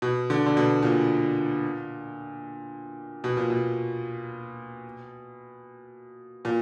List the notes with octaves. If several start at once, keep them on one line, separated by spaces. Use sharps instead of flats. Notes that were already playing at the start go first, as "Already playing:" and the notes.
B2
D3
D3
B2
A#2
B2
A#2
B2
A#2